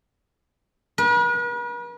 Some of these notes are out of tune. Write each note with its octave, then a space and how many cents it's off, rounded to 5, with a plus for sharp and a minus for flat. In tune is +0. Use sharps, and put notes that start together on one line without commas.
B4 -45